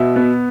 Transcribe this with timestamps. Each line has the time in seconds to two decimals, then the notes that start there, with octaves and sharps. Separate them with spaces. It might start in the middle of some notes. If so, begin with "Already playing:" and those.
Already playing: B2 E5
0.16 B3